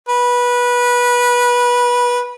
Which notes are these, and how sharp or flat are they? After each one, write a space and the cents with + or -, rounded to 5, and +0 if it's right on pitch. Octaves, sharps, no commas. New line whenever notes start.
B4 -20